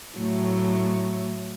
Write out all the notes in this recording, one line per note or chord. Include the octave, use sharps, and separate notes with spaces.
A2 F#3 A3